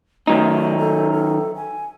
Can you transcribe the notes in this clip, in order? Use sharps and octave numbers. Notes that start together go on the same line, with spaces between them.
D#3 F#3 A3 D#4
A4
A4
G#5